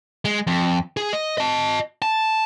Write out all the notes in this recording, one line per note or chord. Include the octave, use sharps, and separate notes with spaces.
G#3
F2
G#4
D#5
D#5 A5
A5